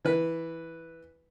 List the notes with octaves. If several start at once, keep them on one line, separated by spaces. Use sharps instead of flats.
E3 B4